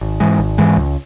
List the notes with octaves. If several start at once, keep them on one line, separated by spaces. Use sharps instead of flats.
G#1
G#2 E3 G#3
G#1
G#2 E3 G#3
C#2